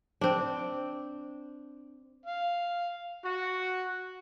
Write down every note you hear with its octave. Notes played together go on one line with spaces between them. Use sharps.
C4 D4
F5
F#4